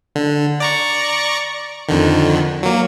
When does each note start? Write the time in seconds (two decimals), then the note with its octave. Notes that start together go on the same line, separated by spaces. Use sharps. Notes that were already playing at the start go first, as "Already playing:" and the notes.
0.16 D3
0.60 D5 A#5 C#6
1.89 F2 D3 D#3
2.63 F#3 A#3